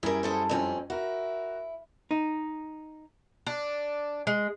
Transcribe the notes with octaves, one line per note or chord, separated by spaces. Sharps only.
F#2 G3 E4 G#4 A#4
G#4 A4 C5
F2 C4 C#4
E4 F#4 A#4
D#4
D4
G#3